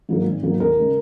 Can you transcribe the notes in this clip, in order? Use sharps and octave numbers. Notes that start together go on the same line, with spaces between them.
G#2 F#3 A#3
G#1
G#2 F#3 A#3
D#2 A#4
C#3 G#3